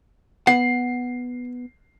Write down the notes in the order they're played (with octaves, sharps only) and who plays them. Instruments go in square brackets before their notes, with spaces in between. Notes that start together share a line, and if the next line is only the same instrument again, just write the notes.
[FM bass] B3 [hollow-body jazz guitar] F#5 [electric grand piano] C7